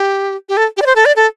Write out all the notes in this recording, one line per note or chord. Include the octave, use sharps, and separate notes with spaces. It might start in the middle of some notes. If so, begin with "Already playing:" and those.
Already playing: G4
G4
A4
G4
D5
C5
A4
D5
A4